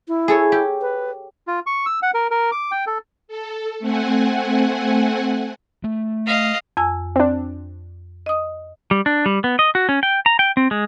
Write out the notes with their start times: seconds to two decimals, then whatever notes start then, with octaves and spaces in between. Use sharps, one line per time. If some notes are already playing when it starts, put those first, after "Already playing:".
0.08 E4
0.28 G#4 A4 C#5
0.52 G4
0.81 B4
1.47 F4
1.66 C#6
1.86 E6
2.02 F#5
2.14 A#4
2.31 A#4
2.52 D6
2.72 G5
2.87 A4
3.28 A4
3.79 A3 C4 F#5 G#5
5.84 A3
6.26 D#5 F5
6.77 F2 G#5 E6
7.16 C4 D4
8.26 D#5 D#6
8.91 G3
9.06 D4
9.26 G3
9.44 B3
9.59 D#5
9.75 F#4
9.89 C#4
10.03 G5
10.26 A#5
10.39 G5
10.57 C4
10.71 G#3